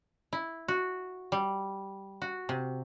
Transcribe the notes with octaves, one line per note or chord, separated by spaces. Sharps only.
E4
F#4
G3
F#4
C3